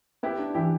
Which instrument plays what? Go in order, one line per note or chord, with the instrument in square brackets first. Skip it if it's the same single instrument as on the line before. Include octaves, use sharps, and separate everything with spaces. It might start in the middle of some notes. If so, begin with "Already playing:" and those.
[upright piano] B3 [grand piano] E4 G4
[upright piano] D4
[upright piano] E3 [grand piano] E4 G4